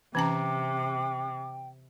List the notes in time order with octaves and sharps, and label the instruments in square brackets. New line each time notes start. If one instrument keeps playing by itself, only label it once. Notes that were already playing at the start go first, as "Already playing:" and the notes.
[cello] C3 [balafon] E3 C#4 A#5 [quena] G5 [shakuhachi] D6